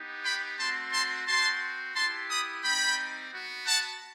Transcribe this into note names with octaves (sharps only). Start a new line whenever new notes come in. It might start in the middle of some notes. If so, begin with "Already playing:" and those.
Already playing: B3 D#4 G4
G5 B5
A3 C4 F#4 A5 C6
A5 C6
C4 F#4 A5 C6
B3 E4 G4 A5 C6
B5 D#6
G3 C4 D#4 G5 B5
B3 F#4
F#5 A5